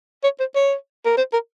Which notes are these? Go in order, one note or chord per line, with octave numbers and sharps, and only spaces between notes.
C#5
C5
C#5
A#4
C5
A#4